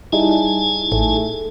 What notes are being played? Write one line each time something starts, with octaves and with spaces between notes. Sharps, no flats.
G3 D#4 E4 G#4 G#5 A5
A1 A3